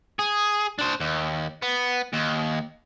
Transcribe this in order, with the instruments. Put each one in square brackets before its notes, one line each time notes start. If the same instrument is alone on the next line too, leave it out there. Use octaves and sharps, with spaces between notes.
[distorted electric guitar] G#4
D4 C5
D#2
B3
D#2